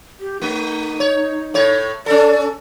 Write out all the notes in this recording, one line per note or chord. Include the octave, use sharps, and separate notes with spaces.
G4
A3 D#4
C#5
A2 C#5
C#4 A4 D5